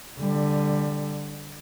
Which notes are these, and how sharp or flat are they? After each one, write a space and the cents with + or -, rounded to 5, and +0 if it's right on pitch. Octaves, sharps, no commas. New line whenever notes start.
D3 +0 G3 +15